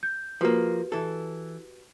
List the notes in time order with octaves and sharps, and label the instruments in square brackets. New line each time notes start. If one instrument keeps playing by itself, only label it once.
[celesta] G6
[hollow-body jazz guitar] F3 A#3 [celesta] F#4 G4 B4
[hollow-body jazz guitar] E3 A4